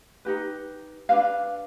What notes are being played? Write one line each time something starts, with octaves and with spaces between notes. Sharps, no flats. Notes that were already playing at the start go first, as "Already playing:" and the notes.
D#4 G4 B4
D4 F4 B4 F5